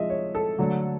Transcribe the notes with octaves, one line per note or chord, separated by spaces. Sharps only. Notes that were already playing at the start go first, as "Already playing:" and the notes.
Already playing: C3 F3 G#3 D#5 E5
C#5
A4
D3 F#3 A3